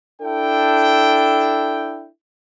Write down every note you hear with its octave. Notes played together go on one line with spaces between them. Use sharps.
D4 E4 A4 G5